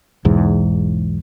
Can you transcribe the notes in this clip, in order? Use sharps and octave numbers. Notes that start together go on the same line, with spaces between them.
B1 E2 G#2